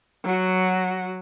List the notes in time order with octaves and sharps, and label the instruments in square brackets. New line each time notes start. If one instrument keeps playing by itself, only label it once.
[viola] F#3 F#4